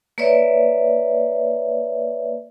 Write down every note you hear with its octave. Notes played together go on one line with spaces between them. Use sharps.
A#3 B4 C#5 D5 E5